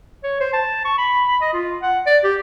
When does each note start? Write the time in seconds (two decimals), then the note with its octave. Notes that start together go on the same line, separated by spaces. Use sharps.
0.23 C#5
0.40 C5
0.53 A5
0.85 C#6
0.98 B5
1.28 B5
1.41 D#5
1.53 F4
1.82 F#5
2.06 D5
2.24 G4